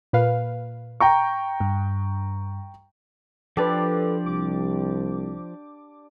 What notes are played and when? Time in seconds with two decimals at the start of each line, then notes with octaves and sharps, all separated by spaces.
0.13 A#2 B4 F5
1.00 G5 A#5 C#6
1.60 G2
3.57 F3 D4 G4 A4 B4 D5
4.26 C2 D6